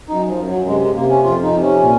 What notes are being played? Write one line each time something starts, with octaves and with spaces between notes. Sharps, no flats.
F#2 D#4
F3
F#2
F#3
C3 G#3
G#3
C3 A#3
C#4
F2 F4
D#4
C3
C#4
A#2